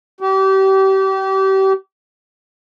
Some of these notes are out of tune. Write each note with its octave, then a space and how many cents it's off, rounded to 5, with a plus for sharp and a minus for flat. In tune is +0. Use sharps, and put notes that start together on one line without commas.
G4 -30